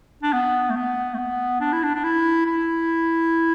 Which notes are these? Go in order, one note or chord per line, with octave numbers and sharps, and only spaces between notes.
D4
B3
A3
B3
A3
B3
D4
E4
D4
D4
E4
E4